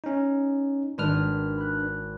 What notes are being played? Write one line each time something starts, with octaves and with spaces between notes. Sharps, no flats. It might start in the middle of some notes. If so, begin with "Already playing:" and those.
C#4 D#4
G#1 D4 B4 F6
B5 F#6